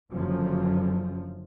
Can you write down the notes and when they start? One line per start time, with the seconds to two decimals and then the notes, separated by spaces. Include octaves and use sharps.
0.10 F#1 F#2 D3 F3